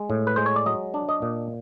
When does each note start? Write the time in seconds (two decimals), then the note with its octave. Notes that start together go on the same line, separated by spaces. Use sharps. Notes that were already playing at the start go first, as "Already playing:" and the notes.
Already playing: G#3
0.10 A2
0.27 B4
0.36 G#3 C5
0.46 C#5
0.56 D5
0.66 F#3 D#5
0.94 D4
1.09 D#5
1.22 A#2